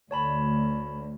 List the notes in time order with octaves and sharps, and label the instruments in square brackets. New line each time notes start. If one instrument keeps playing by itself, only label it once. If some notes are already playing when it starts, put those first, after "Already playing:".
[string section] D2 [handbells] C#5 A5 B5